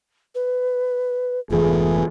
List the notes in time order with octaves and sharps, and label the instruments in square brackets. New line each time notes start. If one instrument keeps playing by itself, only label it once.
[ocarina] B4
[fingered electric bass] F1 G#2 E3 [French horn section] A3 B3 G#4 [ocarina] F4